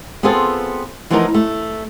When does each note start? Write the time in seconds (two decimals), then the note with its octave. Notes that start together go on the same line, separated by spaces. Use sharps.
0.23 B3 C4 F4 G#4 A4
1.10 E3 F3 A3 B3 D#4 A#4
1.34 A3